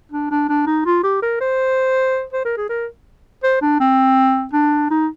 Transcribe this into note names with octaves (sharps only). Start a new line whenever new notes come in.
D4
D4
D4
D#4
F4
G4
A#4
C5
C5
A#4
G#4
A#4
C5
D4
C4
D4
D#4